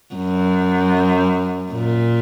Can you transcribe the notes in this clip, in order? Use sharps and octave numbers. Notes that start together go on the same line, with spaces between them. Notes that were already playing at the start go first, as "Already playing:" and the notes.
F#2
A#2